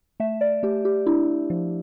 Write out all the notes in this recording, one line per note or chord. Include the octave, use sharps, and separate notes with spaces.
A3 E5
D5
A3 G4
G4
D4 E4
F3